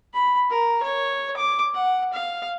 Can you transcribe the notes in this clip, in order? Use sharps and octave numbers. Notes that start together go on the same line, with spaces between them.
B5
A#4
C#5
D6
F#5
F5